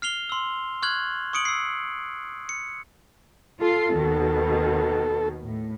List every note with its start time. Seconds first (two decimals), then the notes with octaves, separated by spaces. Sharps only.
0.02 F6 C7 F7 G7
0.29 C6 E6
0.82 C#6 F6 F#6 G#6 F#7
1.33 C#6 D#6 C#7 D7 F#7
1.45 E6 C7
2.49 C#7
3.61 F4 A4 C7
3.95 D#2 B2 D#3
5.44 A2